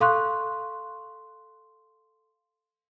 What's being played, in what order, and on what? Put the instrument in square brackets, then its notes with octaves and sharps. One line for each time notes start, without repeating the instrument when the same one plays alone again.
[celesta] A4 F5 C6 C#6 F#6